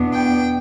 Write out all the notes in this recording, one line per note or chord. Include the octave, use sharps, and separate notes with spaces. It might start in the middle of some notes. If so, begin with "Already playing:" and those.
Already playing: E2 B2 B3 D4
G5